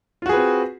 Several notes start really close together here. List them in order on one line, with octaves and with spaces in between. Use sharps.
F4 F#4 G#4 B4 C4